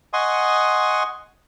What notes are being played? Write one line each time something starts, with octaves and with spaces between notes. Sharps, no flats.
D#5 F#5 G#5 C6 C#6 D#6